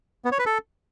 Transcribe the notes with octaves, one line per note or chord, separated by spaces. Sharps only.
B3
C#5
B4
A4